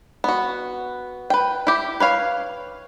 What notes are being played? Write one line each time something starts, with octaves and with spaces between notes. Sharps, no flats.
B3 F#4
B4 G5
E4 G4
B4 C#5 F5